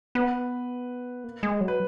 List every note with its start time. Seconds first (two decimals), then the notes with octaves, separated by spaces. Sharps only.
0.15 B3 B4
1.24 A#3
1.43 G#3
1.61 F#3
1.68 B4